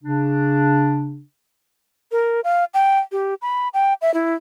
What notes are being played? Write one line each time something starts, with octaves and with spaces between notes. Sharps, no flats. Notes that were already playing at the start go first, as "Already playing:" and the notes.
C#3 D4
A#4
F5
G5
G4
B5
G5
E5
E4